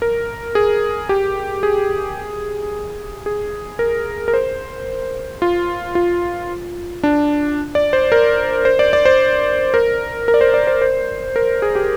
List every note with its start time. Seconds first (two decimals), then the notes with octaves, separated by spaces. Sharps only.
0.02 A#4
0.55 G#4
1.09 G4
1.63 G#4
3.26 G#4
3.79 A#4
4.28 A#4
4.34 C5
5.42 F4
5.95 F4
7.03 D4
7.75 D5
7.93 C5
8.12 A#4
8.65 C5
8.79 D5
8.93 D5
9.05 C5
9.74 A#4
10.28 A#4
10.34 D5
10.41 C5
10.54 D5
10.67 C5
10.82 C5
11.36 A#4
11.62 G#4
11.75 G4